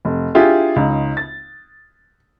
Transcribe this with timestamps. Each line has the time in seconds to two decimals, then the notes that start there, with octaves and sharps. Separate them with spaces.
0.05 F1
0.35 D4 E4 F4 G4 G#4
0.76 C#2 D#4
1.17 A6